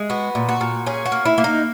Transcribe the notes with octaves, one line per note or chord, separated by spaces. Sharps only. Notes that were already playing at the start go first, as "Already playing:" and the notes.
Already playing: G#3
B3 F#4
A#2
F#4
A#2
C#4 G#4
F#4
A#3
E4
A#3
D#4